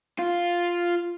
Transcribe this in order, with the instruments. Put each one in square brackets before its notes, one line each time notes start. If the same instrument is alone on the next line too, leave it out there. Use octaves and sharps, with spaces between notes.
[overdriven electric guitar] F4